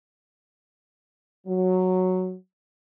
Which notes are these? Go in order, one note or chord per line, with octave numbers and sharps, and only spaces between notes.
F#3